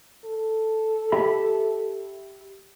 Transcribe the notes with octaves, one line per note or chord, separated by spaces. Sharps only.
A4
G4 E5 B5